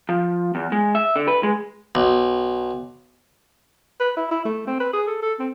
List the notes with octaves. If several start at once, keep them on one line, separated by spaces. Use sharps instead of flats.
F3
E2
G#3
E5
D3
B4
G#3
B1
B4
E4
E4
A3
C4
B4
G#4
A4
A4
C4